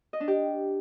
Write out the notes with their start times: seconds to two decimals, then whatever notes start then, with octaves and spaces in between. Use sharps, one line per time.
0.13 D#5
0.20 D4
0.28 G4